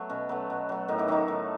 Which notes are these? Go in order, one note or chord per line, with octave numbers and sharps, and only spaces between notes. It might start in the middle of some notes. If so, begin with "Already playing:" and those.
Already playing: F#3 A3 B3
B2 C#4
F#3 A3 B3
B2
F#3 A3
A2 D#3 D#4
E3 E4
D#3 F#3 A3 D#4
A2